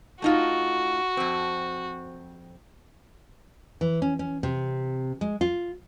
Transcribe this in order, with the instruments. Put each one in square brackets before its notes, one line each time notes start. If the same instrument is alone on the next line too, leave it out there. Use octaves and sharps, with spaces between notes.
[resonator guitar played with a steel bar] A3 D#4 F4 [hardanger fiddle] F#4
[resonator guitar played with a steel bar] F2 C4
[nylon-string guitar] E3
C#4
C#4
C3
G#3
F4